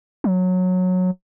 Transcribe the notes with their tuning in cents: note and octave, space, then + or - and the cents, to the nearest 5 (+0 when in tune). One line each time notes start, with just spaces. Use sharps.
F#3 -15